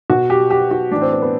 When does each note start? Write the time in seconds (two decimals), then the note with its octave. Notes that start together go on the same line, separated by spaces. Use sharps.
0.10 B2 F#4
0.30 G4
0.51 G4
0.71 F#4
0.91 A2 E3 D4
1.01 C4
1.12 B3
1.22 B3